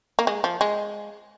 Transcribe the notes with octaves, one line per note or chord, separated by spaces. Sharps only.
A#3
G#3
F3
G#3